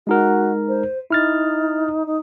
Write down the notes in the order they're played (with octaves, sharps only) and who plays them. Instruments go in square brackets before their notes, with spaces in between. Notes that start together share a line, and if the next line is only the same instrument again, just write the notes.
[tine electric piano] G#3 D#4 A#4 [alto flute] F#4
[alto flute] C5
[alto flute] D#4 [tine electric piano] E4 F6 A6
[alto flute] D#4